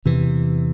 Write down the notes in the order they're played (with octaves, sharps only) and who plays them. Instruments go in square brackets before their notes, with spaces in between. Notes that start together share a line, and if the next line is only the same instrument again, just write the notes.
[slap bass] E2 C3 E3